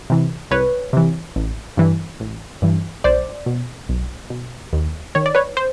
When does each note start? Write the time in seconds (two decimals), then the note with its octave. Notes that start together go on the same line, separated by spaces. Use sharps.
0.10 C3 E3
0.51 C2 B4 C#5
0.93 C3 E3
1.36 A1
1.77 G2 E3
2.20 A1
2.62 G2 E3
3.04 B1 C5 D5
3.46 B2
3.89 B1
4.30 B2
4.73 D#2
5.15 D#3 C#5
5.26 D5
5.35 B4 C#5
5.57 C5